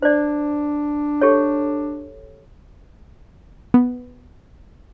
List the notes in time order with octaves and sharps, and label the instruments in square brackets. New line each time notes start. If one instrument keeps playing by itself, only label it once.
[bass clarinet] D4 [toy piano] C5 D5
[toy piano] G4 A4 C#5
[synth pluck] B3